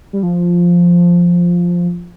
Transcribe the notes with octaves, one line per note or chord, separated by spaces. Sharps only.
G3
F3